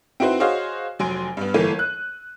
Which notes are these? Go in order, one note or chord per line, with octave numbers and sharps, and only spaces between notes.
C4 D#4 E4 F#4 B4 C5
F#4 G#4 C5 C#5 D#5 F5
F1 F#3 G#5 C6 D7
G2 B3
G1 E3 A3 A#3 D#7
F#6